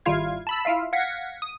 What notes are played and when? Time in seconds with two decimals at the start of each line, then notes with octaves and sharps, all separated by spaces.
0.06 G#1 G3 E4 F4 F5 G#6
0.47 A5 B5 E6
0.65 E4 F4 E5 F5
0.93 F5 F#5 G#6 A#6 B6 C#7
1.42 D#6